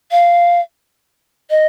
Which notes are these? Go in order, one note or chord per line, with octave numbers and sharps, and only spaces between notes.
F5
D#5